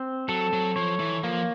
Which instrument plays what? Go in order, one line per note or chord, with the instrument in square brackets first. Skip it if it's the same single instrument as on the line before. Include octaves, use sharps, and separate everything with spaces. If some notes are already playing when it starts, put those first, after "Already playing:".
Already playing: [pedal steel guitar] C4
[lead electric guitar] F#3 [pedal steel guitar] A4
[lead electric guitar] F#3
[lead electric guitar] F3 [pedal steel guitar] C#5
[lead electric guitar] E3
[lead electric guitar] F3 [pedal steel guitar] A#3